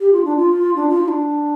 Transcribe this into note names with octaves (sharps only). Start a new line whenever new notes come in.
G4
F4
D4
F4
D4
F4
F4
D4